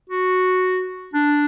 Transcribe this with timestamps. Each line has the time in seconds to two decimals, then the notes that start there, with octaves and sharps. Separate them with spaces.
0.09 F#4
1.14 D4